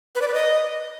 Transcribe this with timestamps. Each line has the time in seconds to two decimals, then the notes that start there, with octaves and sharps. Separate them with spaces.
0.15 B4
0.22 D5
0.28 B4
0.34 D#5